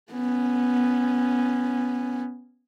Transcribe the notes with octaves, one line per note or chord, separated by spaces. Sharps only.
B3 C#4